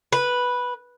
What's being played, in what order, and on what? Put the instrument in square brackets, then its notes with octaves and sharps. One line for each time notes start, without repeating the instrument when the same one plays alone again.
[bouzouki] B4